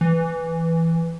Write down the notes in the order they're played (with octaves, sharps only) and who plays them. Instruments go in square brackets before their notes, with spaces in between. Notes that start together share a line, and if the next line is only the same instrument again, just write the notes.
[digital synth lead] E3